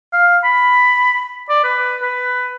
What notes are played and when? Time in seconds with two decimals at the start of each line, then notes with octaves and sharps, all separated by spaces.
0.13 F5
0.44 B5
1.49 D5
1.64 B4
2.02 B4